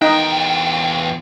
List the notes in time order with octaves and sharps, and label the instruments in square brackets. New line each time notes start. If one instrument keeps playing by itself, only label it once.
[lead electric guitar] E2 G5 [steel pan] D#4